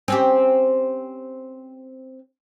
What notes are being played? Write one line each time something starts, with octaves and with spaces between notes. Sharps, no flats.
C4 C#4 G4